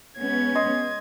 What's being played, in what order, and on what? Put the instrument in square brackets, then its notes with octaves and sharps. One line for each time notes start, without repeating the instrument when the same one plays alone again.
[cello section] G#3 B3 C#4 [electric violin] G#6
[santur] D#5 C6